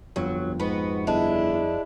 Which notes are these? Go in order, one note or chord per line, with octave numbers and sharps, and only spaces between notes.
G1 F2 F#3
G#2 B3 F#4
G1 G#3 D4 E4